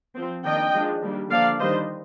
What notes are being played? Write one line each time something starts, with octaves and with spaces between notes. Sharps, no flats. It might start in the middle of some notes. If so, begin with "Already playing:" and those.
F3 C4
D#3 A#3 D4 D#5 G5
F3 G#3 D4
D#3 G3 A#3 D4
D3 F3 A#3 D4 D5 F5
D#3 G3 D4 C5 D#5